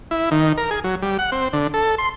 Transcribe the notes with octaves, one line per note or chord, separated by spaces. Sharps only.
E4
D#3
A#4
G#4
F#3
G3
F#5
C4
D3
A4
C6